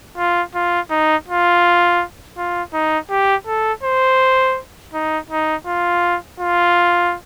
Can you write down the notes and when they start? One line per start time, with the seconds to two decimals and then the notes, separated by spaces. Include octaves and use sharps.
0.17 F4
0.55 F4
0.90 D#4
1.28 F4
2.37 F4
2.73 D#4
3.10 G4
3.47 A4
3.83 C5
4.93 D#4
5.30 D#4
5.66 F4
6.40 F4